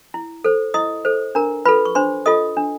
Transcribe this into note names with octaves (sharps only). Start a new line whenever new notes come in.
E4
A4 C5
E4 D#5 D#6
A4 C5
D4 A#4 A#5
F4 A4 B4 B5
C#6
D4 C5 C6
F4 A4 D#5 D#6
D4